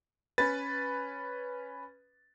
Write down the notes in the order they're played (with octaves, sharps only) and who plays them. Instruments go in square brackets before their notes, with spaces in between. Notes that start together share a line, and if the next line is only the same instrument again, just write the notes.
[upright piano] C#4 B4 [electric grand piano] A6